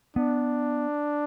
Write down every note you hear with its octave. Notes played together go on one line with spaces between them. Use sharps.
B3 D4